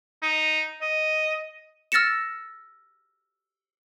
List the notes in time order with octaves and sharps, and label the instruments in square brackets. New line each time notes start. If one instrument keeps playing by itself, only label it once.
[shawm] D#4
D#5
[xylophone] E6 F6 A6 A#6 C#7 E7